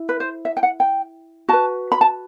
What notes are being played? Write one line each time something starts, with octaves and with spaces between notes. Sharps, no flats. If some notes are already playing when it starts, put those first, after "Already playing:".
Already playing: E4
B4
C5
E5
G5
F#5
G5
F#4 B4 A5
B5
A5